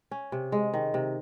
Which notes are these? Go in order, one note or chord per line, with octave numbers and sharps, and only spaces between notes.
C#4
C3
G#3
D#3
C3